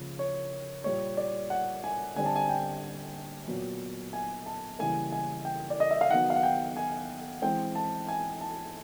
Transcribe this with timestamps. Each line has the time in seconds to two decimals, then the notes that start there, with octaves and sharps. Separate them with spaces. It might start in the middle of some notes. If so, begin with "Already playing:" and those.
Already playing: C#3 F3 A#3
0.19 C#5
0.84 A#2 G3 A#3 C#5
1.17 D5
1.50 F#5
1.84 G#5
2.16 D3 G3 C4 G#5
2.26 A5
2.36 G#5
2.49 G5
3.48 A#2 F#3 B3
4.13 G#5
4.46 A5
4.79 C#3 E3 G3 A#3 G#5
5.12 G#5
5.45 G5
5.70 D5
5.80 D#5
5.91 E5
6.01 F5
6.10 D#3 F#3 B3 F#5
6.30 F5
6.36 F#5
6.43 G5
6.77 G#5
7.42 E3 G#3 C4 G5
7.75 A5
8.08 G#5
8.41 A5